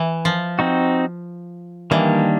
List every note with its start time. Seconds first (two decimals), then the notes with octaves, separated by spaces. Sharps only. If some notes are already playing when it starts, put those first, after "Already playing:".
Already playing: E3
0.25 F3
0.59 C4 D#4 F#4
1.91 D#3 E3 G3 A#3 D4